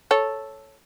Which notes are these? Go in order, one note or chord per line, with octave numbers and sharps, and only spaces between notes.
A4 C#5